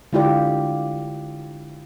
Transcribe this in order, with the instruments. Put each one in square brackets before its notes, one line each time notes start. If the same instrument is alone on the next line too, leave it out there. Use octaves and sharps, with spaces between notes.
[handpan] D3 G#3 E4 F4 G4 D5